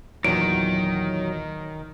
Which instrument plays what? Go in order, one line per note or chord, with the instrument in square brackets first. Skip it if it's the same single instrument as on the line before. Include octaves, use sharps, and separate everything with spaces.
[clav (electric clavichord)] E2 A#2 [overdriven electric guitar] D#3 [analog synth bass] F#3 [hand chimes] D7